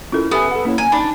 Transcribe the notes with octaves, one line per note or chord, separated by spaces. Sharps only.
C#4 E4 F4 A4 A#4
B3 G4 A4 E5 G#5
A4 F#5
A#3 C#4 E4 C#5
A#3 G#5 A#5
D4 D#4 B5